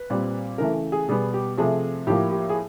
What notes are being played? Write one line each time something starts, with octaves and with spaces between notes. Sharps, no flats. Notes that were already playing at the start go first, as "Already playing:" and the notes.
Already playing: B4
A#2 G3 C4
C#3 E3 A3 A#4
G#4
B2 G3 B3 G#4
G4
C3 F3 A3 C4 G#4
A2 F3 A#3 G4
G4
G#4